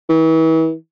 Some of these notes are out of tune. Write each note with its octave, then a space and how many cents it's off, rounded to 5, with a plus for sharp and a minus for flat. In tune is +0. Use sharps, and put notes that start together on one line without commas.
E3 -35